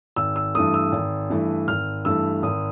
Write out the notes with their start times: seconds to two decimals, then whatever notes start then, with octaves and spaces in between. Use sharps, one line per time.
0.16 G#1 E6
0.36 E6
0.55 G2 E3 A3 D#6
0.74 E6
0.92 G#1
1.30 G2 E3 A3
1.68 G#1 F6
2.05 G2 E3 A3 E6
2.43 G#1 D#6